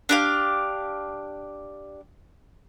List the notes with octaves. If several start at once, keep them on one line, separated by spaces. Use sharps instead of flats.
D4 G4 F5